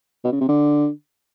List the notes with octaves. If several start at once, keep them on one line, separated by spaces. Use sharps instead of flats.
B2
C#3
C3
D3